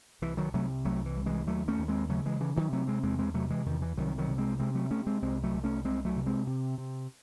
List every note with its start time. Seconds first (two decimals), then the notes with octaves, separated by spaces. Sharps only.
0.22 C2 E3
0.37 D#3 F#3
0.54 C3 F#3 A3
0.84 C2 F#3 A3
1.06 E3
1.16 C2
1.26 E3 G#3
1.47 D#2 F#3 A3
1.68 A3 C#4
1.79 D#2
1.88 G#3 C4
2.09 C#3 F#3 A3
2.26 E3 G#3
2.40 C#3 E3
2.56 D#3 F#3
2.72 C3 F#3 A3
2.88 G#3 C4
3.03 E2 G#3 C4
3.19 G#3 C4
3.34 C3 F#3 A3
3.50 E3 G#3
3.66 E2 D#3
3.82 E3
3.97 C2 D#3 F#3
4.18 D#3 F#3
4.28 C3
4.38 G#3 C4
4.59 C3 G#3 C4
4.75 F#3 A3
4.91 C3 A3 C#4
5.07 G#3 C4
5.22 C2 G#3 C4
5.44 F#3 A3
5.53 C2
5.64 A3 C#4
5.84 C2 G#3 C4
6.05 F#3 A3
6.16 C3
6.26 G#3 C4
6.47 C3
6.78 C3